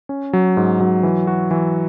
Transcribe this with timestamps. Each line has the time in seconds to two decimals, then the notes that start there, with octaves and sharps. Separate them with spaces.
0.09 C#4
0.33 F#3
0.57 G#2
0.80 F#3
1.03 E3
1.27 F#4
1.51 E3